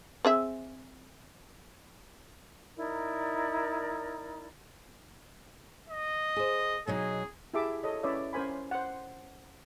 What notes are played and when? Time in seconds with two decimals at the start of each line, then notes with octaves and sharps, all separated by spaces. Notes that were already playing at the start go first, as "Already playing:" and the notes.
0.25 C4 G#4 E5
2.77 D#4 E4 A#4 D5
5.89 D#5
6.36 G#4 C5
6.87 B2 F#3 D#4 G#4
7.54 E4 G4 G#4 E5 A5 D6
7.84 A4 C#5 D#5
8.03 C#4 E4 B4 C#5 D5 E5
8.33 C#4 A#4 C5 G#5 B5
8.71 C5 F#5